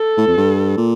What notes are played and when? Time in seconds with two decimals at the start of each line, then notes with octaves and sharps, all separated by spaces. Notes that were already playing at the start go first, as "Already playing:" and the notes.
Already playing: A4
0.17 A2
0.27 F2
0.37 G2
0.77 A#2